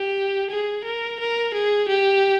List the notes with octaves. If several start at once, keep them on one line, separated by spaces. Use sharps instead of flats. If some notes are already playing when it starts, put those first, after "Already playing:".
Already playing: G4
G#4
A#4
A#4
G#4
G4